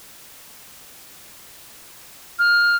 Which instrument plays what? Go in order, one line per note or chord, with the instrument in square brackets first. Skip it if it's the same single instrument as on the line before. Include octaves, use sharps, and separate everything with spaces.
[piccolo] F6